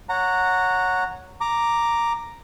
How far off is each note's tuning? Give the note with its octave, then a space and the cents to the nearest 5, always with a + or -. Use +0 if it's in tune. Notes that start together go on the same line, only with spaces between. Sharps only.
C#5 +0 F#5 -10 A#5 -15
A#5 +0 D6 +0